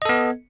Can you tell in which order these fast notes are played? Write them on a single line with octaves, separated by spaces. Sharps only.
D#5 A4 B3